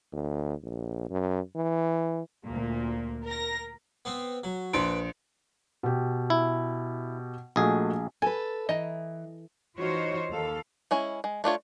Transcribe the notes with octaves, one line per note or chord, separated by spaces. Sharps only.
D2
A#1
F#2
E3
D2 A#2 A#3
A#4 A#6
B3 C4
F#3
A#1 B4 C6 D7
B2 G4
E4
A#1 A3 F#4 G#4 D#5
A4 B4 G#5
E3 D#5 A#5
E3 D#4 F4 F#4 C5 C#5
D#2 A4 F5
G#3 C#4 E4
G#3
A3 D4 F4 C#5